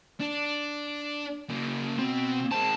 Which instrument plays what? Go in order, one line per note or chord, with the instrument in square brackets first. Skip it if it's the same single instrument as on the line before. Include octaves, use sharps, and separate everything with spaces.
[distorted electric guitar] D4
C#3 A#3
[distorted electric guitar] B2 [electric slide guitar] C4
[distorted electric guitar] G#3 C4 [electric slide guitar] A5